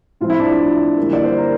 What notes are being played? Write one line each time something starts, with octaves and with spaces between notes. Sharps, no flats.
A2 F3 A3 C4 F4
E4
D4
E4
D3 G3 A#3
D5
C5
A#4